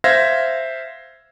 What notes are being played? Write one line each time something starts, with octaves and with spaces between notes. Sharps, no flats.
C5 E5 F5 G#6 A#6